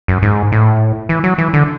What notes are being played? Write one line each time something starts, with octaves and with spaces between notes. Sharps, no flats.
F#2
G#2
A2
E3
F#3
E3
D3